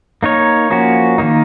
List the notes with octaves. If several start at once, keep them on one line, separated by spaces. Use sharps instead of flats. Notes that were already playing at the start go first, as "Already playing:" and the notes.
A#3 D#4 A#4 C#5
F3 A#3 C#4 F#4
D#3 A#3 D#4